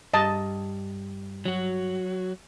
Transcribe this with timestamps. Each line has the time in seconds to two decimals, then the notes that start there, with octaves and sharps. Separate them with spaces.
0.14 G2 D#5 A5
1.45 F#3 F#4